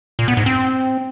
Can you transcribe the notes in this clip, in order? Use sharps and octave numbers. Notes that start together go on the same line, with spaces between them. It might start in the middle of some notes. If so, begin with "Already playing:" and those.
A#2
B3
G#2
C4